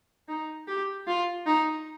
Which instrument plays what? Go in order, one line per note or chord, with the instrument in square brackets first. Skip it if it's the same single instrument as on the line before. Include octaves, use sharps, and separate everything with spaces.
[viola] D#4
G4
F4
D#4